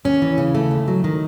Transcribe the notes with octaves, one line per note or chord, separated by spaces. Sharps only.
D#2 C#4
E3
C#3
A3
D#2
F#3
D#3